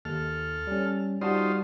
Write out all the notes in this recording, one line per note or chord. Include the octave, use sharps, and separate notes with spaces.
D#2 A4 F6
G3 C#4
G3 D#4 F4 F#4 C5 A5